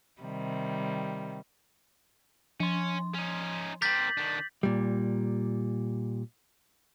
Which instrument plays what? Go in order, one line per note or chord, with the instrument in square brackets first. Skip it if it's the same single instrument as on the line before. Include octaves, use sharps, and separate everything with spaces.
[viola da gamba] C3 D#3 G3
[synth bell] F3 C6 [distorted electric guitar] C#4
[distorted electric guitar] C#4 D#4
[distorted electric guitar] C4 A#4 [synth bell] D6 F#7 [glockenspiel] G6 A6 B6
[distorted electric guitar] D#3 D4
[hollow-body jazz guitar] A#2 G3